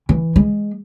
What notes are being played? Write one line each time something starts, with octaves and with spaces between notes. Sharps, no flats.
E3
G#3